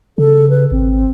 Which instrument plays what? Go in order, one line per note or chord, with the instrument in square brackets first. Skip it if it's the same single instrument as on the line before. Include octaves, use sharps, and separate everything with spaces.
[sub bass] C#3 [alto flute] A4
[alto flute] B4
[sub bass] G#1 [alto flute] C4